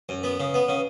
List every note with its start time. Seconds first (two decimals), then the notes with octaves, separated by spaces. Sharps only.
0.09 F#2
0.23 B3
0.40 C#3
0.54 B3
0.68 C#3